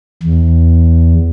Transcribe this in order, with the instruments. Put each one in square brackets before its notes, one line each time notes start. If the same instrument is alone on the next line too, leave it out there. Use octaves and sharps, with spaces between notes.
[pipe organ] E2